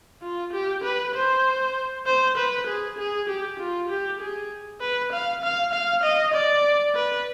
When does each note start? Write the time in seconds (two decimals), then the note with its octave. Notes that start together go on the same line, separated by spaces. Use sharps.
0.23 F4
0.53 G4
0.84 B4
1.15 C5
2.06 C5
2.38 B4
2.67 G#4
2.98 G#4
3.29 G4
3.60 F4
3.89 G4
4.21 G#4
4.81 B4
5.13 F5
5.43 F5
5.73 F5
6.04 D#5
6.34 D5
6.95 B4